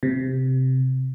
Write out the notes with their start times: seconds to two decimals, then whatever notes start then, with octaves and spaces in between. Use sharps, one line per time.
0.03 C3